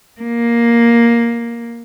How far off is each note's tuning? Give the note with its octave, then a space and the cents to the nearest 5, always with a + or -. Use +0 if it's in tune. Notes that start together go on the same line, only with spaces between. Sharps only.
A#3 +5